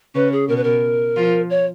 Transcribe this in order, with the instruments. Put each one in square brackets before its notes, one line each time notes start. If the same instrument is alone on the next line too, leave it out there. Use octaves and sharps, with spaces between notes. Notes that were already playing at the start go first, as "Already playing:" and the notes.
[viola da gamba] C#3 C#4 [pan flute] B4
[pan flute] G#4
[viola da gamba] B2 B3 [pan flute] A#4
[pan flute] B4
A#4
[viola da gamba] F3 F4
[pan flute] C#5